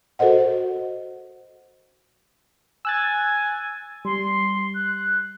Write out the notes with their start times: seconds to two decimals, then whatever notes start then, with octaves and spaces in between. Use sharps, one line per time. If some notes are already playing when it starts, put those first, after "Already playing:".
0.19 F#4 A4 A#4 C5 D#5 F#5
2.85 G#5 E6 F#6 A6
4.05 G3 C6
4.74 F#6